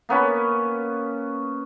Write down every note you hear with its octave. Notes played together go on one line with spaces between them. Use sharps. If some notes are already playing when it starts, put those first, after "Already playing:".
A#3 B3 C#4 B4